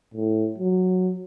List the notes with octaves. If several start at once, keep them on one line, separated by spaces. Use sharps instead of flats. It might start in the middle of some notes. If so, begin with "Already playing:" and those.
A2
F#3